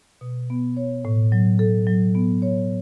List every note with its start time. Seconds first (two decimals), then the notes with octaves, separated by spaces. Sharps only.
0.21 B2
0.50 B3
0.77 C#5
1.05 A2
1.32 F#3
1.59 A4
1.87 F#3
2.15 B3
2.42 C#5